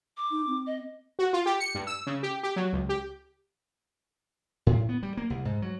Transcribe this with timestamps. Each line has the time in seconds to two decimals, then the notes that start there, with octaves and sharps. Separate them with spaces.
0.17 D6
0.31 D#4
0.47 C4
0.66 D#5
1.19 F#4
1.33 F4
1.46 G4
1.60 C#7
1.75 G2
1.87 E6
2.07 C#3
2.23 G4
2.43 G4
2.56 F#3
2.73 C#2
2.89 G4
4.67 A2
4.89 B3
5.03 G3
5.17 A#3
5.30 C2
5.45 G#2
5.62 F#3